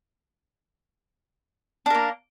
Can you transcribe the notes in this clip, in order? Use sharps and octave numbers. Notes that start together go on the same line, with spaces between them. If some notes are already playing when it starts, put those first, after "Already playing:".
A#3 D4 A#4